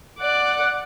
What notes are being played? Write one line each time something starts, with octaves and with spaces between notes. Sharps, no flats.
D5 F#5